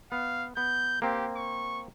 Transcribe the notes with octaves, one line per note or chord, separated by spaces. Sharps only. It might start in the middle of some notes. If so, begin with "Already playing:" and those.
B3 F5
B3 G6
A#3 C4 G4
C#6